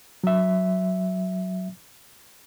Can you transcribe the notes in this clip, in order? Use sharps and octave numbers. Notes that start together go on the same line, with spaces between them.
F#3 E5